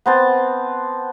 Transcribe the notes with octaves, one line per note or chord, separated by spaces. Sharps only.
B3 C4 A5